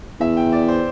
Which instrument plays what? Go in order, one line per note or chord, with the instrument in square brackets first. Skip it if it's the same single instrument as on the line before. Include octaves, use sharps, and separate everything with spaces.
[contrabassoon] E2 [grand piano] E5
[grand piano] G5
D5
C5